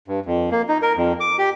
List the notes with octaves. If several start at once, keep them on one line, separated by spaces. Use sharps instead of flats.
G2
F2
A#3
D#4
A#4
F2
D6
G4